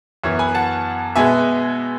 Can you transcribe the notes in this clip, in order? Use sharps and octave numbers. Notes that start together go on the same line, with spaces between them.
F#2 E3 B3 C#5 E5
G#5 B5
F#5 A5
B2 G#3 B3 E5 G#5